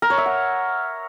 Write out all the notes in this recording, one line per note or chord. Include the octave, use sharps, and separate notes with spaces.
A#4
C#5
E5
F#5